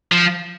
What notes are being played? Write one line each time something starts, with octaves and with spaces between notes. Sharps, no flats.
F3